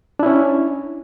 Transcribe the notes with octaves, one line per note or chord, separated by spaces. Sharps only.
C#4 D4 E4